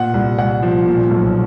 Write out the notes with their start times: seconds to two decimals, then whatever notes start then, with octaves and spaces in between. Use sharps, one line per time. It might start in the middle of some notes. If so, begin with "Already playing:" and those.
Already playing: A#2 F#5
0.14 C2
0.38 C2 F#5
0.62 F3
0.86 A#2
1.11 B1